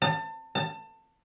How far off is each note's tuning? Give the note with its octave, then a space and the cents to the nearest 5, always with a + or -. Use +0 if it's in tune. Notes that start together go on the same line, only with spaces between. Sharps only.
A5 +30
A5 +25